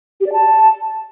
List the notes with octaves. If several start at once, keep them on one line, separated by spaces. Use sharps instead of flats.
G4
D5
A5